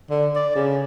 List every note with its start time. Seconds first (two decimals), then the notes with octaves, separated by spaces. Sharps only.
0.10 D3
0.36 D5
0.56 C#3